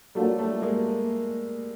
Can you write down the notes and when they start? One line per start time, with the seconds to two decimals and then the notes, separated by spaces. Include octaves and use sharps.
0.15 A2 F#3 G3 A3 A#3 D4 F4
0.38 G3 A3
0.62 G#3 A#3